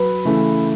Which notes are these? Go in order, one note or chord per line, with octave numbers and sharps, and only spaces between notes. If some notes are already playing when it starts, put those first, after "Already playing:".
Already playing: F#3 B4
C#3 E3 A3